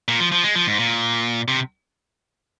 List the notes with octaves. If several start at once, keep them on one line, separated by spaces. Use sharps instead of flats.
A#2
F3
F3
G#3
F3
G#2
A#2
C3